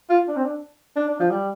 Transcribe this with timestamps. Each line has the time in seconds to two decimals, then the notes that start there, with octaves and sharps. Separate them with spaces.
0.10 F4
0.28 D4
0.36 C4
0.44 D4
0.96 D4
1.08 D4
1.20 F3
1.30 G3